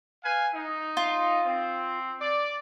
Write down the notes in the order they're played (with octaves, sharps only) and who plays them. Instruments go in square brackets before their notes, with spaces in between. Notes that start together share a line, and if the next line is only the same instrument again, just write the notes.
[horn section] B4 F5 G#5
D#4
[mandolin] F4
[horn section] C4
D5